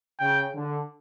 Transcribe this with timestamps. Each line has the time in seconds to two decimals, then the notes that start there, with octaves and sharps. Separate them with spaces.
0.19 C#3 G5
0.53 D3